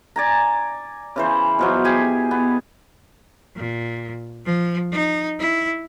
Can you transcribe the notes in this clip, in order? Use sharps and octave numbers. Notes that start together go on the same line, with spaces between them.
D5 G#5 A#5
C#3 E3 C5
B2 F3 F#3
G4 G#4 G#5
B3
A#2
F3
D#4
E4